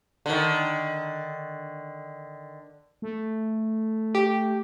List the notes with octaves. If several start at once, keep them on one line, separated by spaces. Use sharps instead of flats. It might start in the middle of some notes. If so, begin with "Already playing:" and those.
D3 D#3
A3
G4